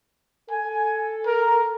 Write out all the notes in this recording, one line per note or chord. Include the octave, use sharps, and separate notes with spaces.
A4 G#5
A#4